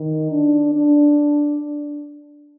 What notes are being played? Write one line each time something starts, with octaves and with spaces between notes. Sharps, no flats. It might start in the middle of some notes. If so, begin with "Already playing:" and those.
Already playing: D#3
D4
D4